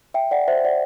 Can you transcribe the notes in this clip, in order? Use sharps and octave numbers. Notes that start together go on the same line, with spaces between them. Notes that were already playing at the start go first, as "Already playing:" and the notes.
E5 G5
D5 F#5
C5 E5
D5 F#5